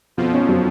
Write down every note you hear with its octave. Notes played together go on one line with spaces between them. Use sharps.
F2 B2 F3
C#4
F#3